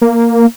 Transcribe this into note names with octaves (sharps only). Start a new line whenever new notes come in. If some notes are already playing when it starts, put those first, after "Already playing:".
A#3